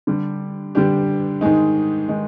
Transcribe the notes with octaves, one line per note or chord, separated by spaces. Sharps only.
D3 G3 D4 G4
D3 G3 D4 G4
G#2 D#3 G#3 D#4
D#3 G#3 D#4